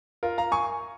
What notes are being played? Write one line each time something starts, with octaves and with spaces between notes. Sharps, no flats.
F4 A#4
F5 A#5
G#5 C#6